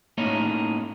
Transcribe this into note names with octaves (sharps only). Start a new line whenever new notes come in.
A2 A#3 C#4 D#4 C#5 D#5